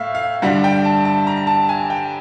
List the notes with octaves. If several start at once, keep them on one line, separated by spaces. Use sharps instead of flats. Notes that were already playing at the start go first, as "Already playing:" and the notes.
Already playing: A2 A3 E5 F5
F5
G2 D3 G3 F#5
G5
A5
A5
A#5
A5
G#5
G5